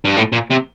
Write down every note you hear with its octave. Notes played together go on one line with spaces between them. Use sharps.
G2
A2
A#2
C3